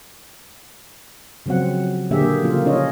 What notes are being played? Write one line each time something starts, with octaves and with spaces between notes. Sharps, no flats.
C#3 F3 F#3 C4 F#5
A#2 D3 A#3 G4 G#4 E5
C#3 F3 A#3 F4
C#4 D4 F4 C#5 D#5